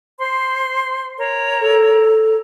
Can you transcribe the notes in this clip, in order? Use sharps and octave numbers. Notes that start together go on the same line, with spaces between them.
C5 C6
A#4 C#5
A4